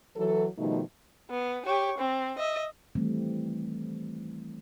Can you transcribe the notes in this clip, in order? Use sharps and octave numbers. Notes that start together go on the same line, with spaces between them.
E3 F#3 A4
B2 D#3 F3 G3 A3 D#4
B3
G4 C#5
C4
D#5 E5
D#3 E3 G3 A3 C4